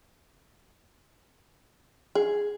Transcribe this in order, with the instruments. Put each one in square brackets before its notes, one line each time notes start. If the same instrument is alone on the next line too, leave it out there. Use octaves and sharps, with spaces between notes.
[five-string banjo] G#4